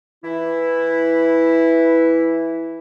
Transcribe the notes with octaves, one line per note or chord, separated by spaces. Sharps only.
E3 E4